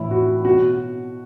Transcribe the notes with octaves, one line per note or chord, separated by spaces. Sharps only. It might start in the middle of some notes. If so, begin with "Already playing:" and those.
Already playing: A2 E3 E4
F#4
B2 F#4